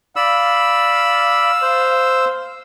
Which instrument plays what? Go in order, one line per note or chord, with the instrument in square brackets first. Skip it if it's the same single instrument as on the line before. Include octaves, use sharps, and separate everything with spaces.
[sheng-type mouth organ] D5 B5 [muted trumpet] F5 [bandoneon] E6
[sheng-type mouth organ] C5